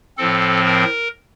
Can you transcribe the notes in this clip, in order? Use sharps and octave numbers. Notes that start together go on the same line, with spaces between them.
A2 F3 C4 A4
A#4